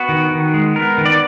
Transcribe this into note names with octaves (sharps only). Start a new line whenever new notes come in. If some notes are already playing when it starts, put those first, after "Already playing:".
Already playing: B3 F#4
D#3
D#3
G#3
B3 A#4
D#3
D5